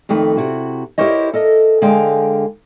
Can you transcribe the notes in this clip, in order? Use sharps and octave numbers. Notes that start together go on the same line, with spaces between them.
F2 D#3 A3 B4
C3 E4 F#4
E4 G4 A#4 C5 C#5 D#5
A4 A#4 D#5
D3 G#3 G#4 A#4 F5 G5